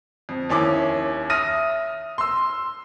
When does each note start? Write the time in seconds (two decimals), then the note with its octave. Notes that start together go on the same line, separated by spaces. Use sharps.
0.29 F2
0.49 D#2 C#4 E4 D6
1.30 E5 D#6 F6 A#6 D#7
2.18 C6 E6